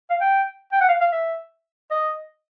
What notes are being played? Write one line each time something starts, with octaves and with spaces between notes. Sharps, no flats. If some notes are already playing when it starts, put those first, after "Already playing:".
F5
G5
G5
F#5
F5
F5
E5
D#5